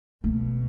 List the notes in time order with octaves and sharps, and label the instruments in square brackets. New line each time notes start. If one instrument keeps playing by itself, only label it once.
[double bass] B2 [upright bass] A3